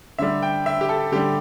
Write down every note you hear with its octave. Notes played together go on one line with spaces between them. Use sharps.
D3 G3 E5
G5
E5
G4
A4
D3 G3 G4